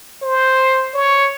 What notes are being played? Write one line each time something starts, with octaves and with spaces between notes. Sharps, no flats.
C5
C#5